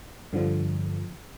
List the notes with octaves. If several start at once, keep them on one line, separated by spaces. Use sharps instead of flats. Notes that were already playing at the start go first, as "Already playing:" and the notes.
G2 D3 F3